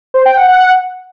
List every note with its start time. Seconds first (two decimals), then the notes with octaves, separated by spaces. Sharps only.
0.14 C5
0.25 G5
0.37 F#5
0.48 F#5